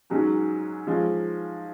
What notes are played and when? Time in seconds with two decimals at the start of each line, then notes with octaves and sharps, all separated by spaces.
0.10 G#2 F#3 C#4 G#4
0.87 F3 G#3 C#4